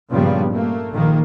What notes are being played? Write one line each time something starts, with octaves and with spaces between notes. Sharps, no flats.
G2 A#2 C#3 F3 G3 B3
A3 A#3
A#1 D#3 A#3